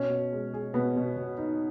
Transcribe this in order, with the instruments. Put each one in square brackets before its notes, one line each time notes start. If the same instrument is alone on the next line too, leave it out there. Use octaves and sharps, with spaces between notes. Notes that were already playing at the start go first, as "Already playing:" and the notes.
Already playing: [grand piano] B2 [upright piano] C#4
[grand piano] B2
G#3
G#4
[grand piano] B2 [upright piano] B3
[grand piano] B2
B2
D#4